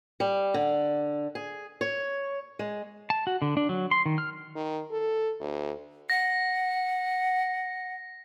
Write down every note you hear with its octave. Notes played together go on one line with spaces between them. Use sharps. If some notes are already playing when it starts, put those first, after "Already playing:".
G3
D3
G#4
C#5
G#3
A5
F#4
D3
D4
F#3
C6
D#3
F6
D#3
A4
D2
F#5 A#6